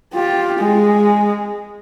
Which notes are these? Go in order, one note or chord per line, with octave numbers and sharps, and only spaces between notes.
F4 G4
G#3